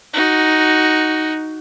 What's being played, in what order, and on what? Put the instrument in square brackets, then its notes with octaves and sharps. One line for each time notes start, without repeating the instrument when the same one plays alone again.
[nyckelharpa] D#4 F#4